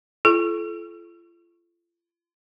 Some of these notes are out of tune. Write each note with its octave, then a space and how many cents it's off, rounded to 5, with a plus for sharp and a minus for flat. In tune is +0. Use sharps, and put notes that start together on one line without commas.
F4 -40 A4 -35